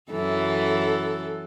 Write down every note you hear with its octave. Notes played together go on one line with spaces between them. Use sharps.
F#2 E3 A4